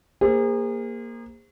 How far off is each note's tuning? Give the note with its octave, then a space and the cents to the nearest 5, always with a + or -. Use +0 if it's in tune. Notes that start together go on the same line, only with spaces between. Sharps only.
A#3 +0 G#4 -35 C5 +0